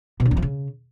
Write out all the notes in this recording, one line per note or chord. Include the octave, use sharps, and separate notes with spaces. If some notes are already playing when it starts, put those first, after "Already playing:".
B2
D3
E2
F3
C#3